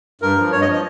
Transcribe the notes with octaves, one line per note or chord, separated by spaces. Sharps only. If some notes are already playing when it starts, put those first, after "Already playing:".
G2 A#4
F3
G2 C#5
D#5
F3
D#5